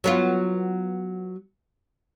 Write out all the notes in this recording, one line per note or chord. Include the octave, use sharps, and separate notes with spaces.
F#3 B3 F4